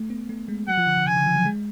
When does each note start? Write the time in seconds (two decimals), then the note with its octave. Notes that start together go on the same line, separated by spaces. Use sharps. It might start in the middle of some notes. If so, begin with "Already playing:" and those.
Already playing: A3
0.10 B3
0.29 A3
0.48 G#3
0.68 F#3 F#5
0.77 F3
0.87 D3
0.97 D3
1.06 C#3 G#5
1.17 D3
1.26 F3
1.36 F#3
1.45 G#3